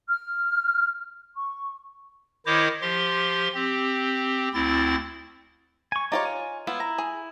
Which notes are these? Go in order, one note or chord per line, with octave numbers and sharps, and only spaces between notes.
F6
C#6
D#3 E4 C5 C#5 D#5 D6
F3 G4 C6
C4 G4
D2 C4 E4 A6
G#5 C#6
D#4 F4 G4 C#5 D5
G#5
B3 E4 F4
A#5
G#4